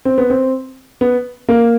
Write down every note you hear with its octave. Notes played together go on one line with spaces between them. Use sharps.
C4
B3
C4
B3
A#3